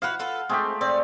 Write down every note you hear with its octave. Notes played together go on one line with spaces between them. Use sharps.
E4 F#4 B4 F5 F#5
F4 A4 B4
G#3 A3 C4 G4
C4 D5